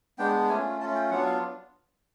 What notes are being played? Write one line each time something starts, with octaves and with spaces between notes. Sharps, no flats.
G#3 B3 D4 G5
A3 C#4 F4 G#5
A3 C#4 F4 A5
G5
F#3 B3 D4 F4 F#5
F5